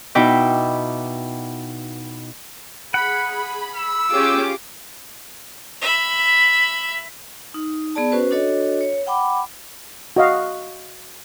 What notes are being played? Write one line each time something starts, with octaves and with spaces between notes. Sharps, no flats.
B2 D#4 E4 G5 D6
G#4 F#5 B5
B5
E6
C#4 F4 G4 G#4 D6
E5 B5
D#4
B3 G#4 D5 A5
C#4 F#4 B4 C5
D4 F#4 A4 C#5 D#5
C#5
F#5 G5 B5 D6
F#4 D#5 F5